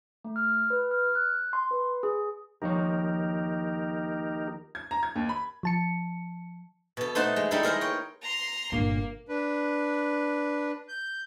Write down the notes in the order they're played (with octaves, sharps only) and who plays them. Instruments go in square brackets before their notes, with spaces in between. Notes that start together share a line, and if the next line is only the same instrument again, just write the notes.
[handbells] A3
F6
B4
F6
F#6
C6
B4
G#4
[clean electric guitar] D#2 F3 C#5 [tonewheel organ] D#4 G4 A#4
[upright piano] G#6
A#5
G#6
D#2
B5
[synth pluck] F3 A5 C#7
[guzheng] B2 A4
A3 D#4 C5 F#5 A5 C6
G#3
G3 G#3 D#4 E4 A4 C5
G#4 A#4 C5 A#5
C#5 G5
[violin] A#5 C6
[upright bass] G1 A#2 [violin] A#3
[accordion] D4 B4
G6